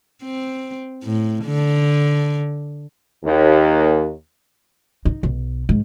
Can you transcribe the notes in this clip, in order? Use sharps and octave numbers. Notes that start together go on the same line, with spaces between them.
C4
A2
D3
D#2
D#4
B1
G#2